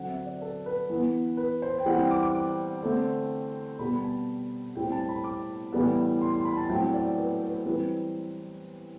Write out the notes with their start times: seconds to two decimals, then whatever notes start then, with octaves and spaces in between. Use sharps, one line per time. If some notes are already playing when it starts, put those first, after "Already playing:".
Already playing: D3 F#3 C4 F#5
0.09 E5
0.26 D5
0.41 A4
0.66 B4
0.90 E3 B3
1.37 B4
1.62 C5
1.79 G5
1.86 E3 G3 C4 F#5
1.98 G5
2.11 D6
2.23 D6
2.35 D6
2.82 D3 A3 C4
3.79 B2 G3 B3 B5
3.96 B5
4.04 A5
4.75 A2 G3 C4 G5
4.92 A5
5.09 B5
5.24 D6
5.73 A2 E3 G3 B3
6.21 C6
6.34 C6
6.45 B5
6.57 A5
6.69 A2 F#3 A3 C4 G5
6.87 C5
6.94 D5
7.18 B4
7.42 B4
7.65 E3 G3 C4 B4